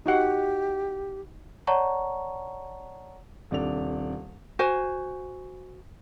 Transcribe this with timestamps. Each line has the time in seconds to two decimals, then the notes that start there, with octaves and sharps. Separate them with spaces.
0.06 D#4 F#4 G4 F#5
1.67 C#5 D5 F#5 A5 A#5 C#6
3.51 D#1 C3 D4 A4 F7
4.59 F#4 C5 G#5